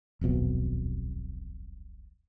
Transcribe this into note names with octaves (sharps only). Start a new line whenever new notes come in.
D#1 B1 F2 B2